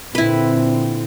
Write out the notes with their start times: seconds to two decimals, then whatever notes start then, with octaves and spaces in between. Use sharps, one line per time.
0.15 A#2 D3 C4 E4 B4